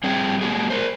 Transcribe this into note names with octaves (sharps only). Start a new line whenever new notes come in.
G3 C4 G#4 G5
G#3 A#3 F#4 G#4
A#4 C5